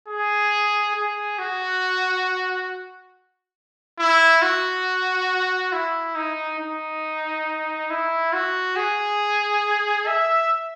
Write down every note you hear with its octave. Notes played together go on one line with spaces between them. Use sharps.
G#4
G#4
F#4
E4
F#4
E4
D#4
D#4
E4
F#4
G#4
E5